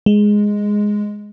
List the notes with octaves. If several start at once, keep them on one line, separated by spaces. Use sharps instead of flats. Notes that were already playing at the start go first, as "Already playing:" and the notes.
G#3